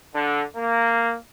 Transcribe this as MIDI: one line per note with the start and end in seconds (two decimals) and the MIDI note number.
0.14 0.42 50
0.56 1.14 58